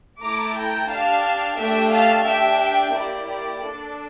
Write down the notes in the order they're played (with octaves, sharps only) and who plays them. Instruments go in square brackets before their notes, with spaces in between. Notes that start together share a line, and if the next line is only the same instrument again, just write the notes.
[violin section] A3 E4 A4 A#5 D6
G5 A#5
D4 G4 F5 A5
A3 D4 G4 E5 G5
F5 A5
D4 G4 E5 G5
E5 G5
A#3 E4 G4 D5
D5
D4 A4